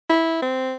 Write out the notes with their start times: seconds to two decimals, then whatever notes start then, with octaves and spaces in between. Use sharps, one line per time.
0.10 E4
0.42 C4